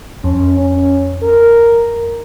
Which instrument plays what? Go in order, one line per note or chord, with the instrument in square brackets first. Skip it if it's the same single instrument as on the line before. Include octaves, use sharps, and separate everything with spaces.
[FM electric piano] F2 [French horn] C#4
[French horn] C#4
A#4